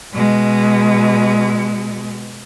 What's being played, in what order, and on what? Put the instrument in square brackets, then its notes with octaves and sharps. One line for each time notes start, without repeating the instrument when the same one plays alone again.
[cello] B2 G#3